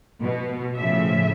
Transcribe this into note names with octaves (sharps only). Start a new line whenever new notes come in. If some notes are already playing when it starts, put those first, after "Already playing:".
B2
A2 C#3 F3 E5